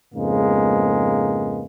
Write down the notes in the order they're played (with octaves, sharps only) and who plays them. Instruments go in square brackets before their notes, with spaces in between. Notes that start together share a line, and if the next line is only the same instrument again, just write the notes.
[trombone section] F2 G#2 C#3 G#3 A#3 B3